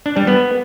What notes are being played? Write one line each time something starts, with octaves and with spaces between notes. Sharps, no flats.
D4
G3
B3